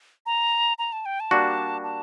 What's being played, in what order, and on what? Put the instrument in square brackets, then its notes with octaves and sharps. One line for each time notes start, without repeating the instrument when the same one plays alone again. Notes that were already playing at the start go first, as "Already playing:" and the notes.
[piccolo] A#5
A#5
A5
G5
A5
[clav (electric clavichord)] G3 A#3 D4 F#4
[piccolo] A5